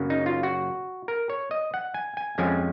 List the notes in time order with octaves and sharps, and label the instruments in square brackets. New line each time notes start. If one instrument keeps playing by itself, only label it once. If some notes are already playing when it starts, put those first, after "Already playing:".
Already playing: [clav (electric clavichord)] F#2 C#3 F#3 A#3 C#4
D#4
F4
F#4
A#4
C#5
D#5
F#5
G#5
G#5
F2 F3 G#3 C#4 G#5